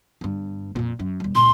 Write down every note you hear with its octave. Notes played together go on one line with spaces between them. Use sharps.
G1 G2
F2 A#2
F#2
D#1 G3
C#2 A#2 C6